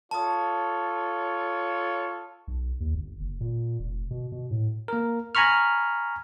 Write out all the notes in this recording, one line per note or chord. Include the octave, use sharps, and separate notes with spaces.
F4 A4 C#5 A5 D#6
B1
D#2
G1
F#1
A#2
F1
B2
B2
A2
A#3 A#4
G#5 A#5 B5 C#6 F6